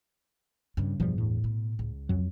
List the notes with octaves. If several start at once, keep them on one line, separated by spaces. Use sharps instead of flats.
G2 C#3
G1 E2 B2 F3 G3
A2
B2
C#2
F2 F#3